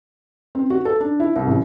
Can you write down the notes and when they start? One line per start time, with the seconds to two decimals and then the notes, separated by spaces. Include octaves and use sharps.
0.55 C4
0.70 F#4
0.85 A4
1.00 D4
1.20 E4
1.36 C2
1.47 A1